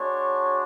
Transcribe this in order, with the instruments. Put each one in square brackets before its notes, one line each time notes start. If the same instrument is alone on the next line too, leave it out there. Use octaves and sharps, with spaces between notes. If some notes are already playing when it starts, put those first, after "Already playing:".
Already playing: [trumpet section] G#3 D4 F#4 C#5